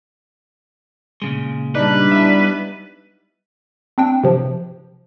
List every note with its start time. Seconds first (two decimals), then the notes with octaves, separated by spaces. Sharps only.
1.22 A#2 C#3 G#3
1.75 G3 D4 D#4 B4
2.12 B3 E4 E5
3.98 C4 D4 G5
4.24 C3 F3